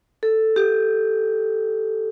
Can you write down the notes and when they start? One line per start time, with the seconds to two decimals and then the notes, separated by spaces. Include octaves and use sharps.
0.23 A4
0.56 G4